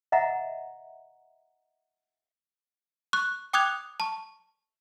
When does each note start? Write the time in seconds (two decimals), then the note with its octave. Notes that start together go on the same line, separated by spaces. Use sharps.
0.12 D#5 E5 F#5 A#5
3.13 C#6 F#6
3.53 G5 D6 D#6 F#6 G#6 F7
4.00 A5 C#6